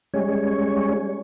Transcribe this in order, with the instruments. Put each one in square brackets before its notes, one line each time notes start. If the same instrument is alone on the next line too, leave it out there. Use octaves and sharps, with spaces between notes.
[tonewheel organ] G3 G#3 C#4 C#5